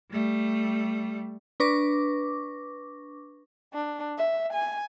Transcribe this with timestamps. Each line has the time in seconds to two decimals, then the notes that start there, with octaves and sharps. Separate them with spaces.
0.11 G3 A3
1.60 D4 B4 C#6 D6 A#6
3.74 D4
4.18 E5
4.53 G#5